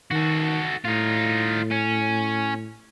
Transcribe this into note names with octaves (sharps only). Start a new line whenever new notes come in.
D#3 F#4 A4
A2 D#4 F4
C#4